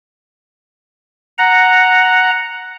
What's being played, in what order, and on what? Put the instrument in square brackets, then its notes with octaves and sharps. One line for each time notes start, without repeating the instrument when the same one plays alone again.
[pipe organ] F#5 A#5